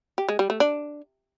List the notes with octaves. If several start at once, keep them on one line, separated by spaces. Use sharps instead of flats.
G4
G#3
G3
A3
D4